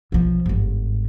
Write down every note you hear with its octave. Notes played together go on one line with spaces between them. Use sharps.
B1 F3
G1 G#2